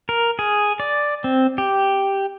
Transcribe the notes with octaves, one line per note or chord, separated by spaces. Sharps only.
A#4
G#4
D5
C4
G4